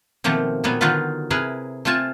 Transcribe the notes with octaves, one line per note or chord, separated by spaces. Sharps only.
B2 D#3 F3 A3 A#3 C4
A#2 F#3 G3 B3 G#5
D3 D#3 F#3 D#4 F4 B4
C3 E4 G#4 A#4 B4
A3 C4 F4 G#5 A5